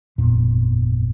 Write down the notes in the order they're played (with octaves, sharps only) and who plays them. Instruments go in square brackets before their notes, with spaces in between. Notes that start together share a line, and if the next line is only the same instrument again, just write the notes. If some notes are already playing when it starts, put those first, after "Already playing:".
[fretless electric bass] G1 F2 A#2 B3